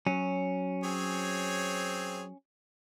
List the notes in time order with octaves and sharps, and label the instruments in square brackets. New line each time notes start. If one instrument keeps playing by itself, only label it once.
[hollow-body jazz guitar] F#3 [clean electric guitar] C#4
[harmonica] C4 G#4 C#5